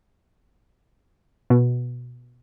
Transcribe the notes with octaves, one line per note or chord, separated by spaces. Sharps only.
B2